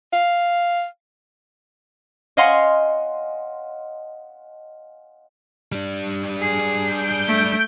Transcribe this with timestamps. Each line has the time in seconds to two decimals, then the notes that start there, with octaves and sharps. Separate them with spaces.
0.13 F5
2.37 C#5 D#5 F5 F#5 G#5 C6
5.72 G3 D4
6.39 G#4
6.81 G6 D7
7.27 A3